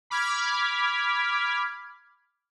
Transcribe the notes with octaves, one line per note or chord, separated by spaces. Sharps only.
B5 D6 F6 G#6 B6